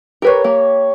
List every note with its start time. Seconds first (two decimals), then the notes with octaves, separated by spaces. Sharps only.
0.22 G4 A#4 B4 C#5
0.44 A#3